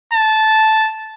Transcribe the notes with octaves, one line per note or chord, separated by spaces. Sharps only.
A5